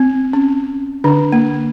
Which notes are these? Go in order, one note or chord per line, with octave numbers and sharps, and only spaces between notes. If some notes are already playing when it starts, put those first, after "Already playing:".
Already playing: C4
C#4
D3 D4
A#3